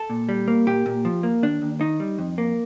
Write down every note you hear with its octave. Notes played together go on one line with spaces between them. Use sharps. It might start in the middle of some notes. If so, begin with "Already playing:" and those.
Already playing: A4
A#2
G3
A#3
A#2 G4
A#2
F3
A#3
D#2 D4
D#2
D#3 D#4
G3
F2
A#3